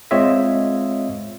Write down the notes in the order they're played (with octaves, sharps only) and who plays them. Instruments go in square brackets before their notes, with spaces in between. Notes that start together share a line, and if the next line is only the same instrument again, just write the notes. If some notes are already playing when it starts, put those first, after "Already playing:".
[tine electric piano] G#3 C4 F4 C#5 D#5 E5